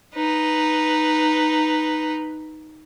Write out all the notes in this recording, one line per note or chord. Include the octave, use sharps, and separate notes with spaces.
D#4 B4